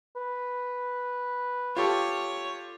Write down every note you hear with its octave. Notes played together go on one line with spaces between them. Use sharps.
B4
F4 G4 A4 C#5